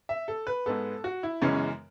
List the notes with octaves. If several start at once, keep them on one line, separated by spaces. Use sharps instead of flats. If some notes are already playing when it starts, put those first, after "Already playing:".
E5
A4
B4
G#2 G#3 B3 A4
F#4
E4
F#2 C#3 E3 G#3 B3 C#4